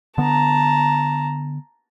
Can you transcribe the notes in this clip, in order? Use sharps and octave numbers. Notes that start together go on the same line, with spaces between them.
D3 B3 A5 A#5